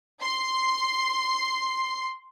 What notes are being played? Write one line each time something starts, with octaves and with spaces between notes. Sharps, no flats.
C6 C7